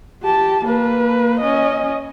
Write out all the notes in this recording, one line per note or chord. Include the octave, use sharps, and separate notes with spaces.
G4 A5
A#3 B4
C#4 D#5